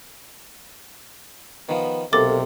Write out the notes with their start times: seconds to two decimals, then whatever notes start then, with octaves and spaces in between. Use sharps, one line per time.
1.69 D#3 F3 B3
2.13 B1 C3 A#3 A4 D6 A6